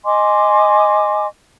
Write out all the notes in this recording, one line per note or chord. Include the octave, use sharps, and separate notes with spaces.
D#5 G#5 C6 D6